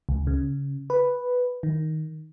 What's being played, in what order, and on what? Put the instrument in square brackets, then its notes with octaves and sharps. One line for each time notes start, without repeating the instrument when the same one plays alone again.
[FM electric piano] C#2
C#3
B4
D#3